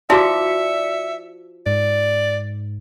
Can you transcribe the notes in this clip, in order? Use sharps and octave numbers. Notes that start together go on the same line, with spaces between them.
F3 E4 F#4 D5 E5 D6 B6 C#7
G#2 D5